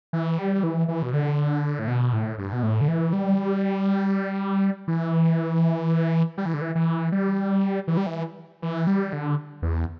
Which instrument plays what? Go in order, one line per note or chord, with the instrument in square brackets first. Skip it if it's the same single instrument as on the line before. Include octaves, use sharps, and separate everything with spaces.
[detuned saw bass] E3
G3
E3
E3
B2
D3
A2
B2
A2
G2
B2
A2
D3
E3
G3
E3
G3
E3
D3
E3
E3
G3
E3
G3
E3
E3
G3
D3
E2